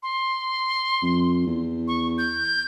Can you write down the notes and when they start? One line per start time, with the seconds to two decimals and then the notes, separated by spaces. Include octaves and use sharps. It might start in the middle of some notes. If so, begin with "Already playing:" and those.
0.03 C6
1.02 F2
1.47 E2
1.88 C#6
2.18 G6